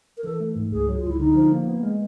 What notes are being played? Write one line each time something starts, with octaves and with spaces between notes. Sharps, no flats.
A#4
E3 A4
A3
G#2
C#2 G#4
F#3
F4
C#2 E4
D3 D#4
F3
A#3
B3
G#3